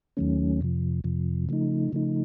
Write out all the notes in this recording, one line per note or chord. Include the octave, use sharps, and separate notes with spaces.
D#2 D#3 F#3 A3 C#4
F2 C3 F3
F2 C3 F3
C#3 F3 A3 D#4
C#3 F3 A3 D#4